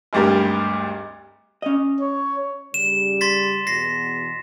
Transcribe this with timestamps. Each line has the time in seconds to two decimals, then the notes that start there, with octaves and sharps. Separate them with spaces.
0.13 G#1 D2 G2 G3 G4 A#4
1.62 C#4 D#5
2.01 C#5
2.74 C#3 G3 E7
3.21 C6 A6 B6
3.67 E2 B2 A#6 C7